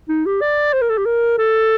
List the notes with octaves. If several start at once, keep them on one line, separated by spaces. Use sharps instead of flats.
D#4
G4
D5
C5
A#4
A4
G4
A#4
A4